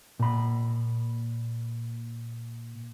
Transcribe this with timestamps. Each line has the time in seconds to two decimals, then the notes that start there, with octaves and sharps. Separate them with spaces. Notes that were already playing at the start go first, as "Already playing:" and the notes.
0.19 A#2 B5